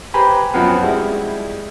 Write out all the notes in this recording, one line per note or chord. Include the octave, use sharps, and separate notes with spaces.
G4 B4 C5 G#5 A#5 B5
F#2 F3 B3 C4 F4 F#4
G3 G#3 E4